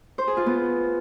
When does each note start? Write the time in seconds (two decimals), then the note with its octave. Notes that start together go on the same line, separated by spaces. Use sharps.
0.18 C5
0.28 G#4
0.37 F4
0.46 B3